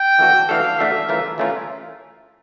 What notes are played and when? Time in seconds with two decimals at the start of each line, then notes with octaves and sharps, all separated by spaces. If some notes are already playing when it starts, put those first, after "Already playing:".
Already playing: G5
0.19 E3 A3 D4 F#4 A4
0.49 E3 A3 D4 F#4 A4 F5
0.79 E3 A3 D4 F#4 A4 E5
1.09 E3 A3 C#4 F4 A#4
1.38 E3 A3 C#4 F4 A#4